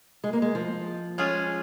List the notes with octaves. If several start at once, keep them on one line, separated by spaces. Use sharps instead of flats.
G#3
A#3
G#3
F3
G#3 C#4 F4 G#4